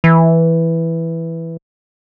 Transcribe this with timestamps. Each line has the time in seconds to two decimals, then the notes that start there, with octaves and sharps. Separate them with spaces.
0.04 E3